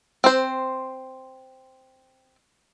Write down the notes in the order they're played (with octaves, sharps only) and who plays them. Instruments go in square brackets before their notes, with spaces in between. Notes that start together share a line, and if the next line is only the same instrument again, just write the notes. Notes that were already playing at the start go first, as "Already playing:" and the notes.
[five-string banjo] C4 C5